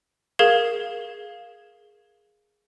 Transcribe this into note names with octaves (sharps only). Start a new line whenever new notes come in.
G#4 A#4 F5 G#6 E7